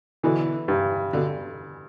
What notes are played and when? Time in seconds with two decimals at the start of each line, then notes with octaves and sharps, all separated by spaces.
0.23 B2 D3 E3
0.68 G2
1.13 B2 D3